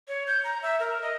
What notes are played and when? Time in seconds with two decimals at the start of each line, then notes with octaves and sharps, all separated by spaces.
0.08 C#5
0.27 G6
0.44 A#5
0.62 E5
0.80 A#4
1.02 D#5